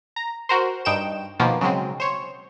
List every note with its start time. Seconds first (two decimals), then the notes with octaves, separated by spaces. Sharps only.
0.16 A#5
0.49 F#4 A#4 C5
0.85 G2 D#4 G5 D7 E7
1.40 B2 D#3 F3 A#3 B3
1.61 C#3 F#3 G#3 C4
2.00 C5 C#5